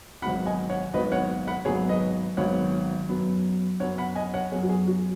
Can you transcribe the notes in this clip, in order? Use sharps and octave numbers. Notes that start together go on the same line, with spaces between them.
G#1 G#2 D#3 F#3 B3 F#5 B5
D#5 G#5
C#5 F#5
G#1 G#2 D#3 F#3 B3 B4 D#5
C#5 F#5
F#5 B5
G#1 G#2 D#3 F#3 B3 G#4 C#5
B4 D#5
G#1 G#2 D#3 F#3 B3 C#5 F#5
F#2 F#3 B3
F#2 F#3 B3 C#5 F#5
F#5 B5
D#5 G#5
C#5 F#5
F#2 F#3 B3 G#4 C#5
F#4
G#4
F#4